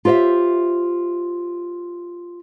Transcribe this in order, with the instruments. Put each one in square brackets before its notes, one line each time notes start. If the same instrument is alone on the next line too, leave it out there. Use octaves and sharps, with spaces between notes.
[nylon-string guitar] F4 G4 C5 D5 E5